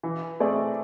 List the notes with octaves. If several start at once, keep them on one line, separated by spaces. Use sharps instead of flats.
E3
A3 C4 G#4 D5